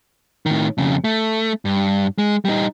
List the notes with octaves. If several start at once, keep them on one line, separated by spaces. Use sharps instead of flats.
A2 D#3
F2 C#3
A3
G2
G#3
G3 D#4